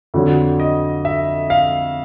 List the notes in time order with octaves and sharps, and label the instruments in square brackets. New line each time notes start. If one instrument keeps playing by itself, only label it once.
[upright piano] F2 D3 F#3
[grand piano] D#5
E5
F5